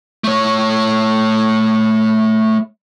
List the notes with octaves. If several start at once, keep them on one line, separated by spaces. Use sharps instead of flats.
A3 C#5